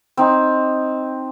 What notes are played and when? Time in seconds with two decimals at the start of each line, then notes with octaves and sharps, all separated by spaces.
0.17 C4 D#4